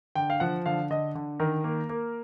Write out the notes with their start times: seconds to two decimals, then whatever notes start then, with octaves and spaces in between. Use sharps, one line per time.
0.15 D3 G5
0.30 F5
0.40 F3 F#5
0.66 D3 F5
0.90 D3 D#5
1.15 D3
1.40 D#3 A#4
1.64 A#3
1.89 A#3